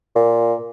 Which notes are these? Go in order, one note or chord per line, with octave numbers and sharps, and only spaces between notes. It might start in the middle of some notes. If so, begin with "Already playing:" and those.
A#2